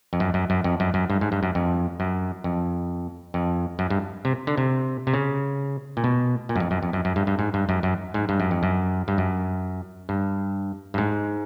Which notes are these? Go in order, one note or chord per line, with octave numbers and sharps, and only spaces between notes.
F2
F#2
F#2
F#2
F2
F#2
F#2
G2
G#2
G2
F#2
F2
F#2
F2
F2
F#2
G2
C3
D3
C3
C3
C#3
A#2
B2
A#2
F#2
F2
F#2
F2
F#2
F#2
G2
G2
G#2
G2
F#2
F#2
G#2
G2
F#2
F2
F#2
G2
F#2
G2
G2
G#2